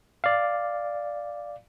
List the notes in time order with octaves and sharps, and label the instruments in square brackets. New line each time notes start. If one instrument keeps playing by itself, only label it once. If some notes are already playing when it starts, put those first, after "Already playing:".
[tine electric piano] D5 F5